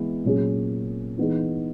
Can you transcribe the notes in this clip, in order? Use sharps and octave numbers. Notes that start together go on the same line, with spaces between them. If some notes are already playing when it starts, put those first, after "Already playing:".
Already playing: E3 G#3 B3
A#2 F#3 C#4 G#4
E3 B3 D#4 G#4